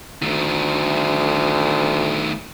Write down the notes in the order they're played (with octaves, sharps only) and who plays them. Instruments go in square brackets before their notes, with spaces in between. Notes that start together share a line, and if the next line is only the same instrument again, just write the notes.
[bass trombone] D2 [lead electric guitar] D#3 A3